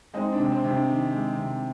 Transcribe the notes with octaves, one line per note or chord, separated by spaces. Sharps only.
G#3 C4 D#4
D4
C3
C4
C3
D4
D#3
G#3
C3